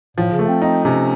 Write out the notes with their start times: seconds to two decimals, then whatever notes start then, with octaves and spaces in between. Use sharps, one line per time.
0.17 A2 F3
0.32 C#3
0.39 A3
0.48 C4
0.62 C4 D#4
0.85 C3 C#4